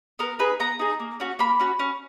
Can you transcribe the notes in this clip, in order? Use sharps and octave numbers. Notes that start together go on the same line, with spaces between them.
B3 A#4
D#4 G#4 B4
B3 A#5
D#4 G#4
A#3
C#4 F#4
A#3 B5
C#4 F#4
C#4